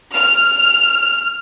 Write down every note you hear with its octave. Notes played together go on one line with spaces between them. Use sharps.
F6